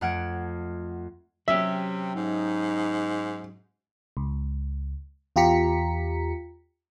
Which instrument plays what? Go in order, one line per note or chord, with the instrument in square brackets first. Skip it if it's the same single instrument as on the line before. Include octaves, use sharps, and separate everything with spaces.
[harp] F2 A3 F#5 F6 G#6 D7
[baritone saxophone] C3 [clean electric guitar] F#3 C#4 G4 [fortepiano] E5
[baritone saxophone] G#2 [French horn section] D#4
[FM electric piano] C#2
E2 F4 G4 A#5 B6 C#7